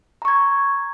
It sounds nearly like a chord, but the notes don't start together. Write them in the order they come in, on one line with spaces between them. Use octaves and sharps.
A#5 C#6 G#6